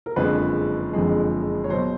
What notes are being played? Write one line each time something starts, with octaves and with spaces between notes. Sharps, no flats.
A#4
F#1 F2 D3 F3 G#3 B4
F#1 F2 D3 F3 G#3
C#5
B2 F#3 C5